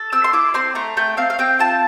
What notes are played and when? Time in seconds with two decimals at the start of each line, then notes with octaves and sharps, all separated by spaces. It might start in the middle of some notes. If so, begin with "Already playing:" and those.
Already playing: A4
0.12 C4 E6
0.24 C6
0.33 E4 D6
0.54 C4 C6
0.75 A3 A#5
0.97 A3 G5
1.17 C4 F5
1.30 F5
1.39 C4 G5
1.59 F4 A5